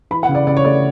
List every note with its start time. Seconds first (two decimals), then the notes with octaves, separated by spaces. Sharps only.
0.11 E3 B5
0.23 F#5
0.29 C#3
0.35 D5
0.47 C#3 D5
0.57 C#5
0.65 A3 D5